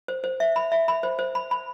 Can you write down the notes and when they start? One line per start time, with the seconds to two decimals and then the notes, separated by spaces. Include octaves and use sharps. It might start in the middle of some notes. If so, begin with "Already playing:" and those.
0.08 C5
0.24 C5
0.40 E5
0.56 B5
0.72 E5
0.88 B5
1.03 C5
1.19 C5
1.35 B5
1.51 B5